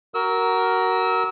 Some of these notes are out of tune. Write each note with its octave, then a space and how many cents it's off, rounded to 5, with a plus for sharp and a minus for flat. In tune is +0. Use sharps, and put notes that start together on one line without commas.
F#4 +20 A#4 +0 E6 -25